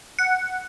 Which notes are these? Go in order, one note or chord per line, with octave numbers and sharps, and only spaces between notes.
F#5